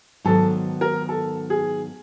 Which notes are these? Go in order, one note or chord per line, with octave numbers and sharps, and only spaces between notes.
G#2 D#3 F#3 B3 A4
A#4
A4
G#4